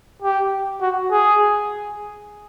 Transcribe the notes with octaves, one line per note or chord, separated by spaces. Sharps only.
G4
F#4
G#4